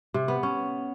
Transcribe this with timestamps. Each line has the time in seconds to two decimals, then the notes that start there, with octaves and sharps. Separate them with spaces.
0.14 C3
0.28 B3
0.43 C#4